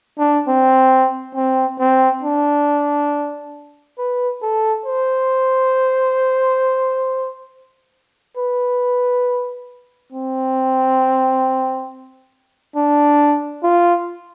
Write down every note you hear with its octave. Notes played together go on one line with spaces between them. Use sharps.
D4
C4
C4
C4
D4
B4
A4
C5
B4
C4
D4
F4